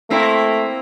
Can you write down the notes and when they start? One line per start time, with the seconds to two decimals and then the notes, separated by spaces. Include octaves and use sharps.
0.10 A3 A#3 C4 E4